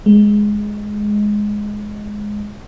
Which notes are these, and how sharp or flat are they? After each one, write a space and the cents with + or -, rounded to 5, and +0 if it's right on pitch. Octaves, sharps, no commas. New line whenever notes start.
G#3 +5